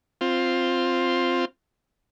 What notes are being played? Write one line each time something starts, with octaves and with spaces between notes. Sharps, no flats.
C4 F4